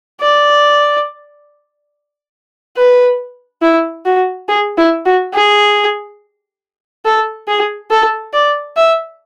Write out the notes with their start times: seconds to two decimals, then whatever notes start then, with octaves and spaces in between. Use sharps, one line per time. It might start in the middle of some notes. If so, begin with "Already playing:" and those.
0.21 D5
2.77 B4
3.62 E4
4.05 F#4
4.48 G#4
4.77 E4
5.05 F#4
5.33 G#4
7.05 A4
7.48 G#4
7.91 A4
8.33 D5
8.77 E5